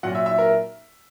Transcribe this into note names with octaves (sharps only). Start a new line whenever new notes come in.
A#2 F#3 F#5
E5
E5
A#4